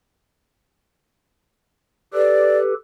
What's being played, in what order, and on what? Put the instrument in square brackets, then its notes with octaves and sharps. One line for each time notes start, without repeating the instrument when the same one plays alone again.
[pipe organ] G4 A4 B4 [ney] D5